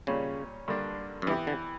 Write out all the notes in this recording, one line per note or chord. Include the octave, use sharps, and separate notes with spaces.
A#2 C#3 G3 C#4
G2 D3 A#3 D4
F#2
G2 E3 B3 E4 G4
D3